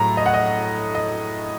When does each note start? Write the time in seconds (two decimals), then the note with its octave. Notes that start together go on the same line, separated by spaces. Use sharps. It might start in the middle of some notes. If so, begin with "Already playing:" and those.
Already playing: A2 F#3 A3 A#5
0.17 D#5
0.26 F#5
0.34 D#5
0.95 D#5